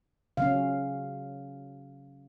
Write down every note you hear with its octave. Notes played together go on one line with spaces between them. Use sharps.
C#3 F#3 C#4 F5